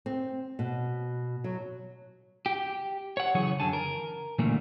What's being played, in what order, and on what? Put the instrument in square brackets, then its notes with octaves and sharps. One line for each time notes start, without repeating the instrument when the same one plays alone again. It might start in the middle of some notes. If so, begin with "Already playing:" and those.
[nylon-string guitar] C4
B2
F#3
[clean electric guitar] G4
C#5 F#5
C#3 E3 F#3 G#4 C#5
F#2 D3 G#5 A5
A#4
A#2 D3 E3 G3 A3 A#3